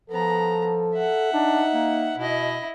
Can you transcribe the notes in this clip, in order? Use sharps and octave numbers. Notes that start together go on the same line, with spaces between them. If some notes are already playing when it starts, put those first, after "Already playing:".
F3 B3 A4 A#5
E5 F#5
D4 D#4
A#3
B2 E4 D#5